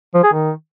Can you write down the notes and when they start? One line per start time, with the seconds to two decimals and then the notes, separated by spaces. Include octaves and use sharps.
0.14 F3
0.23 G#4
0.33 D#3